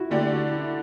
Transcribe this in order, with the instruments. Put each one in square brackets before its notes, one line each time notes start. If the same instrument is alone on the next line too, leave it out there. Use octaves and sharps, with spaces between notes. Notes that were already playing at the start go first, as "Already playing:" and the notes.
Already playing: [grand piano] E4 F#4
[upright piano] D3 A3 D4 G4 D5 [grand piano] F#4
[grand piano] F#4
E4